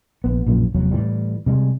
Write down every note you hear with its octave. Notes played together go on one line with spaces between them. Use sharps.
A#1 D#2 B3
A#1 F#2 A#2 C#3
F1 E2 F#3
A2 E3 G3
C3 G3 G#3